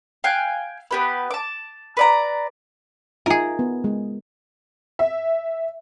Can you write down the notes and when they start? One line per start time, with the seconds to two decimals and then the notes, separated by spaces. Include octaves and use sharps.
0.24 F5 G5 G#5 F#6
0.91 B3 G4 B4
1.31 A5 D6
1.97 B4 D5 A#5
3.26 D#4 F4 G#4 A#4 E5
3.59 B3
3.84 G#3
4.99 E5